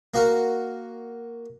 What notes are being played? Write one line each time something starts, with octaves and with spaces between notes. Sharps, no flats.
A#3 F#4 A#4